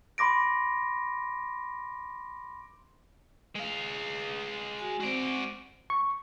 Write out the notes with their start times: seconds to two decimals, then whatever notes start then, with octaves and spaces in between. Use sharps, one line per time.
0.18 B5 C6 D6 A#6 D7
3.55 G#3 F5
4.79 F#4 G#5
5.00 G#3 C4 F#4 C5 D5
5.90 C#6